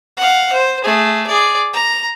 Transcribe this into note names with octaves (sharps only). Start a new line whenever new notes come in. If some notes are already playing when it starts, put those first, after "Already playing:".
F5 F#5
C5
A3 G#4
G#4 D5
A#5